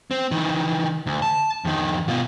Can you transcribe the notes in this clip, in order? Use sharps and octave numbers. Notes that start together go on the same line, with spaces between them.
C4
D#3 E3
D2
A5
F2 D#3
B2 F4